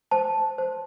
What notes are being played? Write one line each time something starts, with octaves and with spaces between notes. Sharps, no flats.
C5 A5
C5